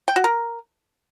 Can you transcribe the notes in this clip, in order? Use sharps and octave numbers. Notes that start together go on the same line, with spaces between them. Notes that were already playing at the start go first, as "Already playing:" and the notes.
G5
F#4
A#4